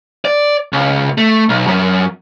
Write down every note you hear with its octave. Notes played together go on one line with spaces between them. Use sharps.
D5
C#2
A3
B1
F#2